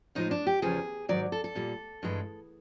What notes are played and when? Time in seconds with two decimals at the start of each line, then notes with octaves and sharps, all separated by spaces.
0.15 A2 F3 G#3 D#4
0.31 D4
0.47 G4
0.62 E2 C#3 F3 G#4
1.09 G#2 D#3 F#3 D5
1.32 A4
1.44 A4
1.55 A#2 G3
2.03 G2 E3 G#3